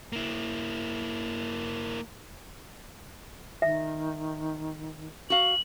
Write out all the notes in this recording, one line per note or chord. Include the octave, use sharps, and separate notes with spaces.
A#3 E4
D#3 E5
F#4 F5 F#7